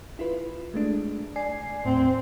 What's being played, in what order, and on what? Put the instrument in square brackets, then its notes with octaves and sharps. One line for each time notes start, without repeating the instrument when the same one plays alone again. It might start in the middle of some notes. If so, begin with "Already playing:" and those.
[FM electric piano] E4 F4 B4
G#3 A3 D4
D5 G#5 C7
[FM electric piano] D#2 A2 [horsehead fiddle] C4